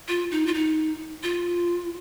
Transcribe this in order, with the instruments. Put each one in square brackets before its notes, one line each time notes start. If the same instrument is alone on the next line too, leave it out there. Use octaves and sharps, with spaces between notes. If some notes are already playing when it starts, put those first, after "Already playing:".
[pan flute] F4
D#4
F4
D#4
F4